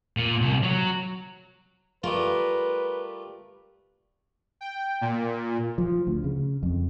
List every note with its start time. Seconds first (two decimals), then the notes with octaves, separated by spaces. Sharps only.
0.17 A#2
0.41 C2
0.63 F#3
2.04 G3 A3 F4 A#4 B4
4.61 G5
5.01 A#2
5.78 F3
6.07 D2
6.24 C#3
6.63 F2